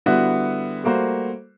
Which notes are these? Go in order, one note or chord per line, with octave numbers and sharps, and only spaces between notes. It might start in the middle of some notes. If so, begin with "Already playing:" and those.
D3 G3 B3 E4 F#4
G3 A3 A#3 F#4 C5